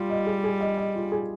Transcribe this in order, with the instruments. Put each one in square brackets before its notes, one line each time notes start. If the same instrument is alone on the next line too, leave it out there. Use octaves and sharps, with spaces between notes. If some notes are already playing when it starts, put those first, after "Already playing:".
Already playing: [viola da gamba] G3 [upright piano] F4
[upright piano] D#5
G#4
G#4
D#5
D#5
F4
G#4